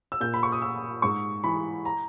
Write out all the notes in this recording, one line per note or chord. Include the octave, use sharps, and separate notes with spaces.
E6
A#2 G6
B5
C#6
D#6
E6
G#2 C#6
E3 B5
A#5